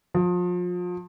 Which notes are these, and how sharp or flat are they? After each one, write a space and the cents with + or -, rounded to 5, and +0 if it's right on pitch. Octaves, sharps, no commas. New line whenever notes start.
F3 +35